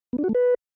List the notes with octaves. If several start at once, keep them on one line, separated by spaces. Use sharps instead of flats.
B3
D4
F#4
A3
B4